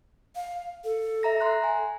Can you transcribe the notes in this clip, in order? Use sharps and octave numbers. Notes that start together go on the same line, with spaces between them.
F5
A4
E5 A#5 A#6
C6 F#6
G#5